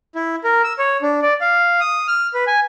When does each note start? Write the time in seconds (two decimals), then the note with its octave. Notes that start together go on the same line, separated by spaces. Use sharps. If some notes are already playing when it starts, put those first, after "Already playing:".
0.15 E4
0.44 A#4
0.64 E6
0.79 C#5
1.02 D4
1.22 D5
1.41 F5
1.81 D#6
2.08 F6
2.34 B4
2.47 G#5